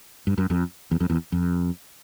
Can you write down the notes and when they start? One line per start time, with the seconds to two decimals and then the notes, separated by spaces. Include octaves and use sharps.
0.27 G2
0.38 F#2
0.50 F2
0.91 E2
1.00 F2
1.10 E2
1.32 F2